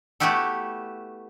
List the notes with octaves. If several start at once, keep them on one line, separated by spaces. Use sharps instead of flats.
A3 B3 E4 F#4 G4 A4